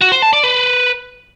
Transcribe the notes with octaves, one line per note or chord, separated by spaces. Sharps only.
F#4
C5
A5
D5
B4